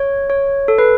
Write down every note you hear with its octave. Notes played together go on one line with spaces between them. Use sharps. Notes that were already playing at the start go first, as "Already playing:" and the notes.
Already playing: C#5
C#5
A4
B4